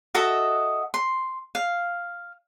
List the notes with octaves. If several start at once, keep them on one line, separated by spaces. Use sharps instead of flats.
F#4 A4 D#5 E5
C6
F5